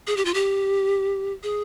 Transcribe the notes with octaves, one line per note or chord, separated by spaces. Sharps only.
G#4
G4
F4
G4
G#4